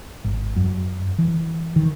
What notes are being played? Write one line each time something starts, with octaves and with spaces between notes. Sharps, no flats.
G#1
F#2
E3
D#3